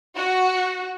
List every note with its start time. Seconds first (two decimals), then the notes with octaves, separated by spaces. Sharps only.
0.16 F#4